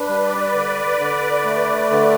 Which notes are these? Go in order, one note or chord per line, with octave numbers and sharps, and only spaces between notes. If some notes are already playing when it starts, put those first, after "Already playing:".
Already playing: D4 B4
G3
D5
D3
D3
A3
D3